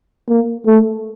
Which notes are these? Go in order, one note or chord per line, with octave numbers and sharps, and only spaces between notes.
A#3
A3